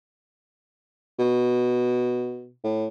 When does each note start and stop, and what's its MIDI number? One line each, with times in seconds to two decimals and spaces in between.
1.19 2.51 47
2.64 2.88 45